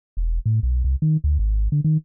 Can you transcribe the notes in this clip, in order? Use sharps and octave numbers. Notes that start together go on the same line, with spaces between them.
E1
A2
B1
C2
D#3
D2
G#1
D3
D#3